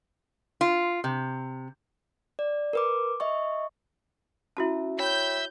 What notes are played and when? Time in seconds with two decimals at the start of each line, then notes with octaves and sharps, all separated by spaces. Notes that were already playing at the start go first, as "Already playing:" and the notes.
0.61 F4
1.04 C3
2.39 D5
2.73 A#4 B4 D6
3.20 D#5 E5 C#6
4.57 C#4 E4 F#4 E5 A5
4.99 C#5 E5 G5 B5 G6